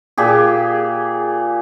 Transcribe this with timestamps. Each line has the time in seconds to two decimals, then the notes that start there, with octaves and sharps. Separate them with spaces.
0.18 A#2 G4 G#4